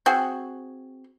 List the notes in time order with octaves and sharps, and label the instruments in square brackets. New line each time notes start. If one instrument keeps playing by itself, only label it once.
[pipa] C4 F#4 G#4